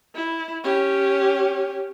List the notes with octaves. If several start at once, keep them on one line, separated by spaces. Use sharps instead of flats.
E4
C#4 G4